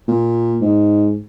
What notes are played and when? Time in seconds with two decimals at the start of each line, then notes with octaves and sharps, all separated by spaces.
0.08 A#2
0.61 G#2